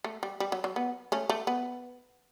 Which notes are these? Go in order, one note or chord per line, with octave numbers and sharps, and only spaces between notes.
A3
G3
G3
F#3
F#3
B3
A3 C#4
A3
B3